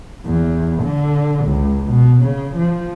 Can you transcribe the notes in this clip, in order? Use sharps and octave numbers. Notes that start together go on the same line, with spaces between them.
E2
D3
C#2
B2
C#3
F3